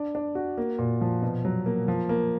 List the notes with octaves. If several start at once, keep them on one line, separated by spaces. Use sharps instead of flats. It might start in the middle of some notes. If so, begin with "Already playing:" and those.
Already playing: D4
D4
F#4
A#3
A#2
F3
B2
F#3
A#3
F3
A#3